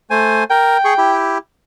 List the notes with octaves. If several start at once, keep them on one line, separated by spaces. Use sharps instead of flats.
A3 C5 G#5
A#4 G5
G#4 C#6
E4 G4